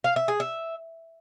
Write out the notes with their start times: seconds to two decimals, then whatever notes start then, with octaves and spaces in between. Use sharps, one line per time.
0.04 F5
0.16 E5
0.28 G#4
0.40 E5